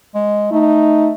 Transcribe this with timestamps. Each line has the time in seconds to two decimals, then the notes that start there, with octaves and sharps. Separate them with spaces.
0.15 G#3
0.52 A3 D#4